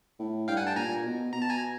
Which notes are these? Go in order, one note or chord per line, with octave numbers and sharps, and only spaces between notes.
A2
G2 F5 G5
F#5 G#5
G5 A5
A#2 G#5 A#5
B2
B2 A#5
A5
G#5 A#5